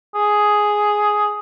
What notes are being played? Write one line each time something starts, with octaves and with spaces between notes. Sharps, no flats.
G#4